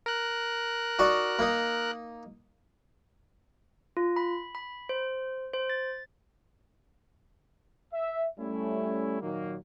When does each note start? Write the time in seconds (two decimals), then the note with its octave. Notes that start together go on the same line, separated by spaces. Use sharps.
0.06 A#4 F#6
0.99 D#4 F#4 D5
1.39 A#3 D#4
3.97 F4
4.16 B5
4.55 B5
4.89 C5
5.54 C5
5.70 A6
7.93 E5
8.39 G3 A3 C#4 E4
9.21 A#2 D#3 F#3 A#3